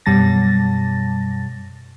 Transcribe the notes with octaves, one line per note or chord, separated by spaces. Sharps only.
F#2 B2 G3 A5 A6 A#6